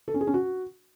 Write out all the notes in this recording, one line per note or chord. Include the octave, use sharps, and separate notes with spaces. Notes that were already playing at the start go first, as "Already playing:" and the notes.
A4
C#4
G#4
C#4
F#4